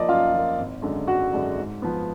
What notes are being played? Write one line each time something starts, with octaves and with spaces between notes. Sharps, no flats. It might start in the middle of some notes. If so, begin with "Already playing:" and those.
Already playing: F3 A#3 D5 D#5
F#2 F4 F5
F3 A#3
G#1
F#2 D3 G#3 D4
G#1 F#4 F#5
F#2 D3 G#3 D4
G#2
F3 B3